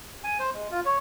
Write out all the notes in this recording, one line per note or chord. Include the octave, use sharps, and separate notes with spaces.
G#5
C5
G#3
F4
C#5